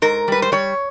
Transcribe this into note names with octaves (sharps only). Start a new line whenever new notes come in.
G#2 A#4
G3 B4
C5
G3 C#5